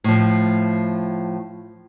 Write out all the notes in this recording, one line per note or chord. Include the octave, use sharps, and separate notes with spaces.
A2 F3